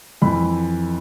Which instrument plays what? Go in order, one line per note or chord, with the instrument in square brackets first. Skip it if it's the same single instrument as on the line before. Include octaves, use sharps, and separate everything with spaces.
[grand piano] F2 E3 B5